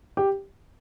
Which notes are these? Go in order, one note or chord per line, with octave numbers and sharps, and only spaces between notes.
G4